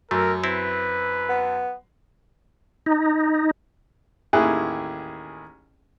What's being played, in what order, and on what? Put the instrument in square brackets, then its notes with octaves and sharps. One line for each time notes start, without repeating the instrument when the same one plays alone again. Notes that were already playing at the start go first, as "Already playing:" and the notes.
[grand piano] F#2 [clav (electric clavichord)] A3 [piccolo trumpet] A#4
[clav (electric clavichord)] C4 E4 [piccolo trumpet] B4
[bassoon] B3
[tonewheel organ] D#4
[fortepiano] A1 D#2 D#3 E4 G#4 F#6